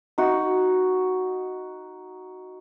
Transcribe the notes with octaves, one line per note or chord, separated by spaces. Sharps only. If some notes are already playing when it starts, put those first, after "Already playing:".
D#4 F#4